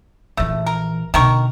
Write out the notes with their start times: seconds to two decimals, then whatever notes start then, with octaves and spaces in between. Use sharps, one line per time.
0.37 A#1 E3 A3
0.66 A#4
1.14 B2 D3 D#3 A#4 C#6